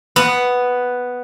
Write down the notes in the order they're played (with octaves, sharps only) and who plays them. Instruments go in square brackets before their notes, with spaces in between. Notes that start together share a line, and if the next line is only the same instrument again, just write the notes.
[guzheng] B3